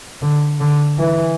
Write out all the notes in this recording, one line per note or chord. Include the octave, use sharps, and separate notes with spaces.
D3
D3
E3